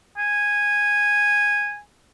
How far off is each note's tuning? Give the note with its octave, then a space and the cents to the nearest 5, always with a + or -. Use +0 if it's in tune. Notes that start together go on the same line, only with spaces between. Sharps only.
G#5 -10